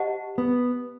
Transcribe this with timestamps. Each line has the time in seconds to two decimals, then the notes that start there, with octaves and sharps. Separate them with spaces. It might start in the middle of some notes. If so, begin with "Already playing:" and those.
Already playing: G4 C5 D#5 F#5 A5
0.38 B3